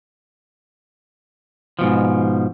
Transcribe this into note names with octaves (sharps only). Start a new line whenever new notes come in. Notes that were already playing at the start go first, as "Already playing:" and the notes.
G#2 B2 F3